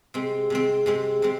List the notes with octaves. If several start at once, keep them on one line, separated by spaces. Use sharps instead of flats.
C3 G#3 C4
C3 G#3 C4
C3 G#3 C4
C3 G#3 C4